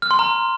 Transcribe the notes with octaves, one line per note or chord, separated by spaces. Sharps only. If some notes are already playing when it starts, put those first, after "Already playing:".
F6
C6
A#5